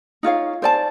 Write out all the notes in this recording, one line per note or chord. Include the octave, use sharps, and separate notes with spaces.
D#4 F4 C#5 F5
C5 D5 A5